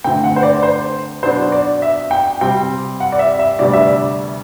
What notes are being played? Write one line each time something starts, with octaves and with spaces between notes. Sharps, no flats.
D2 D3 A3 C4 G5
F#5
C5
D5
C5
B2 F#3 B3 D4 C5
D5
E5
G5
C3 G3 C4 G5
F#5
D5
E5
E5
D2 C3 G3 B3 D4 D5
E5
D5